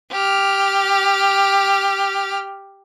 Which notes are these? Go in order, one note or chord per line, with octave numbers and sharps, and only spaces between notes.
G4 F6